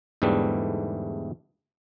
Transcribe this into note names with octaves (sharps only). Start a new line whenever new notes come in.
E2 G#2 D3 E3 G3 A3